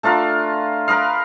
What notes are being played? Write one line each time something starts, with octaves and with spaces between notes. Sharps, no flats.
A3 D4 F4 A#4
A#4 B4 D#5 F5